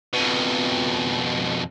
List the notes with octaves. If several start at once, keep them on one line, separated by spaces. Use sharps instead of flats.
F2 B2